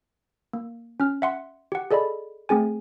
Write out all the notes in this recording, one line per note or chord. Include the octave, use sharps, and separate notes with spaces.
A#3
C#4 F6
E5 F#5 C6
G4 F#5
G#4 A4 D5 D#5 B5
A3 C4 G#4 G#5